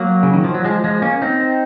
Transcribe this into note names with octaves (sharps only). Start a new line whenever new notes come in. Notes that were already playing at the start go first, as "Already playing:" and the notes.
Already playing: F#3 A#3
C#3
D#3
F3
F#3
F3 G#3
F3 G#3
A#3 C#4
C4 D#4